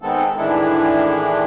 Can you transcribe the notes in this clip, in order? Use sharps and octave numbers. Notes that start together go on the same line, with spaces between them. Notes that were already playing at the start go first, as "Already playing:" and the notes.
D#3 G#3 B3 C4 A4
A2 D#3 E3 G#3 D4 E4